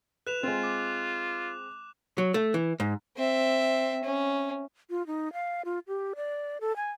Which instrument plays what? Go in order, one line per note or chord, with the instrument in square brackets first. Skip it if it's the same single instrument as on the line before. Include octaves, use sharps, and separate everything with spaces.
[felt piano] B4 [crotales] F#6 E7 F7
[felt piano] G#3 C4 [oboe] F4
[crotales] D6
[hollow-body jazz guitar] F#3
A3
E3
G#2
[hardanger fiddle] C4 E5
C#4
[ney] F4
D#4
F5
F4
G4
D5
A4
G#5